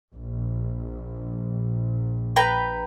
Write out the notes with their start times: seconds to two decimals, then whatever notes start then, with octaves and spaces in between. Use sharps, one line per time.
0.13 A#1
2.36 B4 G5 A#5